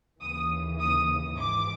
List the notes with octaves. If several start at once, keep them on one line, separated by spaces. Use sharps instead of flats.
D#2 C#3 E3 D#6
D#6
G#1 G#2 E3 D6